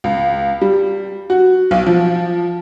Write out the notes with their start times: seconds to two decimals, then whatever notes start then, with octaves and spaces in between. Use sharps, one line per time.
0.04 C#2
0.61 G3
1.30 F#4
1.71 B1
1.86 F3